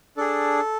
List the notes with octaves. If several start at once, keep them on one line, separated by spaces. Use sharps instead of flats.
D4 G#4 A4